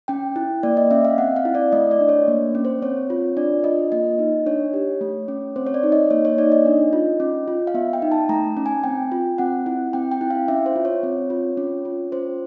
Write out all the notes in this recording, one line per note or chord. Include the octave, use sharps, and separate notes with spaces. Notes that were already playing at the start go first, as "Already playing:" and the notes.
C#4 G5
E4
A#3 D5
D#5
C#4 E5
F5
C4 F#5
F5
E4
D5
A3 D#5
D5
D4
C#5
A#3
C#4
C5
C4 C#5
F4
D4 D5
F4 D#5
A#3 D#5
D#4
D4 C#5
G4
A3
C#4
C4 C5
C#5
D5
D#4
D#5
A#3 C#5
C#5
D#4 D5
D#5
D4
F4
C#4
F4
F5
B3 E5
G5
D#4
A5
A3 A#5
C#4
G#5
C4 G5
F4
C4 F#5
E4
C4 G5
G5
E4
F5
C#4 E5
C5
F4
C#5
C4
F4
C#4
F4
C#4 C5